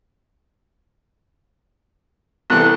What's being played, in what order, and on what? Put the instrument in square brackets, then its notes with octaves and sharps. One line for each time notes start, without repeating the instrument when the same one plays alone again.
[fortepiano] C2 E3 A4 [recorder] F#6